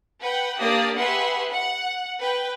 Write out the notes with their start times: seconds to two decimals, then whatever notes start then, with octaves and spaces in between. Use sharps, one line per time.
0.21 B4 F#5 G5
0.59 A#3 D4 G4 D5 D#6
0.96 G4 G#4 B4 E5 F#5 C6
1.51 F#5
2.19 B4 G5